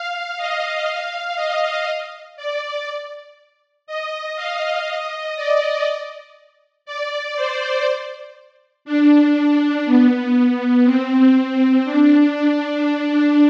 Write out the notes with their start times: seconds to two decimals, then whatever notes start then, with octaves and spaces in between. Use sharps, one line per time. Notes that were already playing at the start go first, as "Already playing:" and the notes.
Already playing: F5
0.38 D#5
0.86 F5
1.36 D#5
2.37 D5
3.87 D#5
4.36 F5
4.87 D#5
5.36 D5
6.86 D5
7.36 C5
8.85 D4
9.86 B3
10.34 B3
10.85 C4
11.35 C4
11.84 D4
12.35 D4